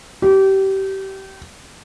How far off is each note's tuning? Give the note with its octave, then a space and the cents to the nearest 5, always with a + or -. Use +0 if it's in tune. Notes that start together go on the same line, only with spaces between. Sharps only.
G4 -25